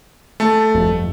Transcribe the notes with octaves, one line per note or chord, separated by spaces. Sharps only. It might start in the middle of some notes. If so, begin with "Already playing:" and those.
A3 A5
G1 F2